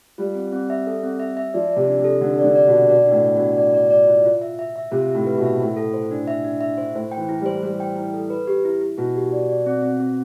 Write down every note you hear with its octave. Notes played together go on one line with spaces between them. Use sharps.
G3 F4
C4
C4
E5
A4
C4
E5
E5
F3 D5
D5
C3
D4
C3
A4
D3 D4
D3 D5
D5
B2
D5
B2 D5
D4
A2
D5
B2 D4
D5
D5
D5
F4
F4
E5
E5
E5
C3 F4
A2 E5
B4
B2
E5
A2 C5
A4
C5
D4
E5
D4
E5
C5
A2 C5
G5
E3
E4
G3
C5
G3 C5
G5
E4
A4
B4
G4
E4
E4
B2 E4
G4
D5
D5
C4
C4
C4